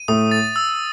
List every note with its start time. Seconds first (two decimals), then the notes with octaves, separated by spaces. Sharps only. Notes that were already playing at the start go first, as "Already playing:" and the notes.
Already playing: D#7
0.08 A2 A3 D#6
0.31 A6
0.56 E6